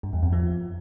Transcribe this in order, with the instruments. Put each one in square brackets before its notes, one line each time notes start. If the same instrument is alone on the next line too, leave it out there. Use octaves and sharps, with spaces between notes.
[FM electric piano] G2
E2
F2
F3